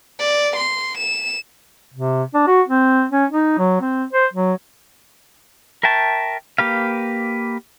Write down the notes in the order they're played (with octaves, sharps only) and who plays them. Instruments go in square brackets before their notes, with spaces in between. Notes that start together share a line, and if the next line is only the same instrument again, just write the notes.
[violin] D5
C6
E7
[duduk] C3
D4
F#4
C4
C#4
D#4
F#3
C4
C5
F#3
[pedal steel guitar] A#4 E5 G5 A5 C#6
A#3 G4 B4 F5